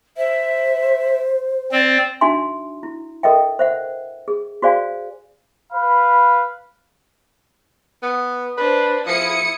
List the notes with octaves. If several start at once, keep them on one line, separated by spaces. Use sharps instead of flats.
C5 E5
C4 D5
D4 D#4 F#4 E5 G#5 C6
E4
A4 A#4 D#5 E5 G5
C5 E5 F#5
G#4
F#4 G#4 C5 D5 F5 G#5
B4 F5 B5
B3
D4 B4 C5
F3 E4 D#6 C#7